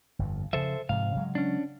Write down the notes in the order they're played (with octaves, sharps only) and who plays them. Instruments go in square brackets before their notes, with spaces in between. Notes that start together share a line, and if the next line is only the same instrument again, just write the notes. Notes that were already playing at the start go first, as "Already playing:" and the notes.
[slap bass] G1 F2
[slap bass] C#3 F3 [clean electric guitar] A4 C5 E5
[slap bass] G#2 C3 F3 [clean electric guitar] F5
[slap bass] C#3 F#3 G#3
[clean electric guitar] C#4 D4